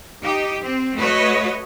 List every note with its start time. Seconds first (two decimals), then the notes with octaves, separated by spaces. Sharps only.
0.22 D#4 G4
0.61 C4
0.97 A3 F#4 B4 C#5 D#5